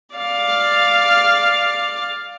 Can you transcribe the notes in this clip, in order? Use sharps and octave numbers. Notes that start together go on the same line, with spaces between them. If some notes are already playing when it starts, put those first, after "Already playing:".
D5 F5